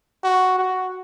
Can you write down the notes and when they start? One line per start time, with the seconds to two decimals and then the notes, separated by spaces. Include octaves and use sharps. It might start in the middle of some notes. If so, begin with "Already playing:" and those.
0.23 F#4
0.58 F#4